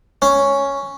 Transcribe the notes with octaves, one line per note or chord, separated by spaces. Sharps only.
C#4